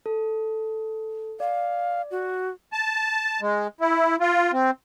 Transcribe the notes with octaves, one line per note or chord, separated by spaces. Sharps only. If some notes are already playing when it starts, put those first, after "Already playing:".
A4
D5 F5
F#4
A5
G#3
E4
F4
C4